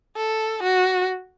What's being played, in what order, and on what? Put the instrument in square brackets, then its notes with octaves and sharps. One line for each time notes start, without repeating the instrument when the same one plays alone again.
[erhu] A4
F#4